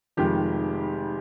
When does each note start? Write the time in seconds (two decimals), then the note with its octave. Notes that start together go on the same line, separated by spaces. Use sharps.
0.17 F1 F2 D#3 G#3 G4